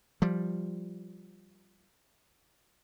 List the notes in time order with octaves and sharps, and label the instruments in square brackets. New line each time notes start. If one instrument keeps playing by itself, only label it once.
[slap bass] F3 G3